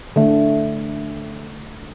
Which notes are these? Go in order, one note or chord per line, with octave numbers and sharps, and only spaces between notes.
D3 A3